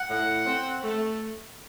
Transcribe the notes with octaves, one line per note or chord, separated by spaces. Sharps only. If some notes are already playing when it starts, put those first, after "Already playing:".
Already playing: F#5
A2
C4
A3